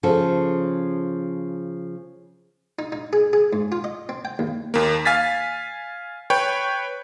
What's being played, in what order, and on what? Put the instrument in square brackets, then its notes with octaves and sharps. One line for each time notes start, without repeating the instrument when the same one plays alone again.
[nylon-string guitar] C#3 F3 C#4 A4
[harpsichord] D#4
D#4
G#4
G#4
G#2
F4
D#5
C4
G5
D#2
[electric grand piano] D#2 A#3
F5 G#5 A6 B6
B4 C#5 G5